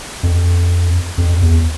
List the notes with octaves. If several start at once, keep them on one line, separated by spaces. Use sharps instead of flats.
F2
F2
E2